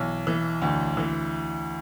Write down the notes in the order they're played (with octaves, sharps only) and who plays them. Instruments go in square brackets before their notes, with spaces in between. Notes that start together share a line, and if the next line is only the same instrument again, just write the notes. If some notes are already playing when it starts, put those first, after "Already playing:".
Already playing: [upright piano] B1 E3
E3
D2
E3